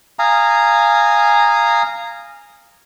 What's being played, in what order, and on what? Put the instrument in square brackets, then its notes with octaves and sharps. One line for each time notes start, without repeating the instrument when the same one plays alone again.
[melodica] F5 G#5 A#5 D#6